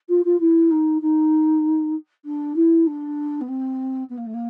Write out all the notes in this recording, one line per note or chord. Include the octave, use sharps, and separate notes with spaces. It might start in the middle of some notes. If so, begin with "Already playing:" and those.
F4
F4
E4
D#4
D#4
D4
E4
D4
B3
C4
B3
A#3
A3
A#3